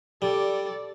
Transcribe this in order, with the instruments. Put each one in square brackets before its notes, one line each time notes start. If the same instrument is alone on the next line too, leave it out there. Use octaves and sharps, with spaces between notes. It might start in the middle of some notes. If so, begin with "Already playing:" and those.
[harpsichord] G3 [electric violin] A4 D5